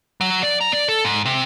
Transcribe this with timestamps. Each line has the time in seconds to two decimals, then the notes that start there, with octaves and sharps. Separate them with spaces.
0.21 F#3
0.43 D5
0.61 A#5
0.72 D5
0.88 A4
1.05 G#2
1.25 C3